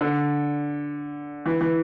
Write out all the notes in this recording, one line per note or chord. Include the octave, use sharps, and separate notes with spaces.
D3
E3
E3